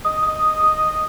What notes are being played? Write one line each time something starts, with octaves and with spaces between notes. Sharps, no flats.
D#5 D#6
D#6
D#5
D#6
D#6